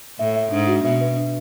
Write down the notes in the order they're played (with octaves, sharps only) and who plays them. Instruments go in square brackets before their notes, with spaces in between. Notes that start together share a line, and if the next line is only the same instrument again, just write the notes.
[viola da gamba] A2 [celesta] E5
[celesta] E5
[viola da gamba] G#2 [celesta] D4
[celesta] F#4
[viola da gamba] B2 [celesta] E5
[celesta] B4
D4